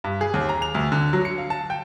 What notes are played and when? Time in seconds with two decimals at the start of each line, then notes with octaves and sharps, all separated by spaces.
0.04 G2
0.21 G#4
0.34 D#2
0.49 A#5
0.62 F7
0.75 D2
0.92 D3
1.13 F#3
1.25 C#7
1.38 F5
1.50 A5
1.70 G5